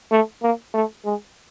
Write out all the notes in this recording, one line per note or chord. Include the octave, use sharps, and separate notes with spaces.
A3
A#3
A3
G#3